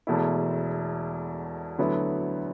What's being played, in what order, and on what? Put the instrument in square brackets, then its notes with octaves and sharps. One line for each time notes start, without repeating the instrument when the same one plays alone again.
[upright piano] E1 E2 B2 A3 E4
D2 D3 F#3 B3 E4